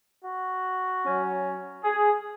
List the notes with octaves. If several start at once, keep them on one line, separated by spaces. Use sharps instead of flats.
F#4
F#3 C#4
G#4